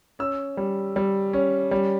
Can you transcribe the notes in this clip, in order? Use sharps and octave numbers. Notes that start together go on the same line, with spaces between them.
C#4 E6
G3
G3
C#4
G3